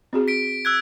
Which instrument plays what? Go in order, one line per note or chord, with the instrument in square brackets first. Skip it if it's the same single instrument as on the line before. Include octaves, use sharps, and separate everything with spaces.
[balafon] C4 F#4 G#4
[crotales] B6 D7
E6 F#6 G#6